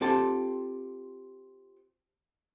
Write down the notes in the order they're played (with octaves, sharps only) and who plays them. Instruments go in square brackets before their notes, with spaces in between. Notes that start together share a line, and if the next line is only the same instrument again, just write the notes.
[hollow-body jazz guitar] C4 F4 G4 A4 A5